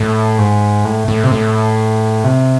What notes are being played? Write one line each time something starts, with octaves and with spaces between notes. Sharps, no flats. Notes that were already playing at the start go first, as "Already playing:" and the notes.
Already playing: A2
G#2
A2
A2
C3
A2
C3